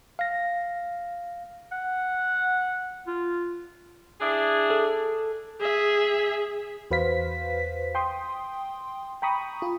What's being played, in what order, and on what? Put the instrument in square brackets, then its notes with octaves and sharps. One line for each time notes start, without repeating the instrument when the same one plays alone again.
[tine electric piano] F5 A#6
[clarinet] F#5
F4
[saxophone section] D4 E4 G#4
[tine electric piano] A4
[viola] G#4 E5
[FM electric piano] E2 F#4 B4 C5 F5 B6
G5 C6 D#6
G5 A#5 B5 C#6 D#6
F4